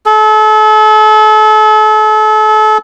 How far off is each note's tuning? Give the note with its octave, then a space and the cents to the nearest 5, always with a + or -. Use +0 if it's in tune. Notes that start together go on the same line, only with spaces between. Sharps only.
A4 -35